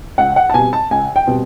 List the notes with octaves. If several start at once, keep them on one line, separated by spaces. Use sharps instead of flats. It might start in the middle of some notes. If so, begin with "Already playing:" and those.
C#2 F#5
F#5
A5
B2 G3 C4 G#5
A5
C#2 G#5
G5
B2 G3 C4